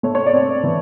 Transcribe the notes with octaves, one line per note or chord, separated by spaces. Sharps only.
A3 C#5
C#5
D5
C4
E3